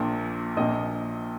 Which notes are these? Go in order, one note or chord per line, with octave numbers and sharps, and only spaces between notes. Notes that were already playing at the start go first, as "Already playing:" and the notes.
Already playing: A#1 A#2
A#1 A#2 D#5